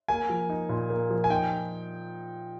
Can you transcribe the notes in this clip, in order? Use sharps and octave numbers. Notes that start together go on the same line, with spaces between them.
A#3 G#5
F3
D#4
A#2
A#3
F3
G#5
D#4 G5